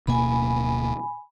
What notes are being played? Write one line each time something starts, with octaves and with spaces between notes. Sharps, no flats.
D1 B2 A#3 G#5 B5